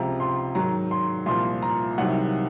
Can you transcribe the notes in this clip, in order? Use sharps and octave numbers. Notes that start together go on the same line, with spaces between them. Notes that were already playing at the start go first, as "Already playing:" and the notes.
Already playing: C#2 C3 F3 A#5
C6
G#2 D#3 F#3 A#5
C6
C2 A#2 F3 C6
A#5
C2 C3 D#3 F#3 F#5